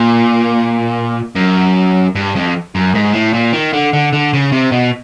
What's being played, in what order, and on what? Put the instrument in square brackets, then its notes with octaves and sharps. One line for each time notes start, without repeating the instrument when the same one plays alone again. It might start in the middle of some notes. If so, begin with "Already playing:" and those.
Already playing: [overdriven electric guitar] A#2
F#2
G2
F2
F#2
G#2
A2
A#2
D#3
D3
D3
D3
C#3
C3
B2